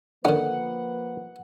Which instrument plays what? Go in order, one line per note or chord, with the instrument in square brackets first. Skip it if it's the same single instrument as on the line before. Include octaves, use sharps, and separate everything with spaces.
[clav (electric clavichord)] D3 [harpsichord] D#3 C#4 [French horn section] F3 A#3 B4 [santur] F#5